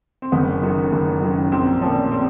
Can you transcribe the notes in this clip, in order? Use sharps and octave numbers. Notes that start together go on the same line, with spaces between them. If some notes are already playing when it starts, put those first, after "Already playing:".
C4
F#1 B3
F#2 D#3
F#1
F#2 D#3
A#1 C4
A#2 F3 C#4
C4